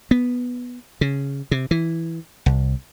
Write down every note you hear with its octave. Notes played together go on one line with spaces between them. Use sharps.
B3
C#3
C3
E3
C2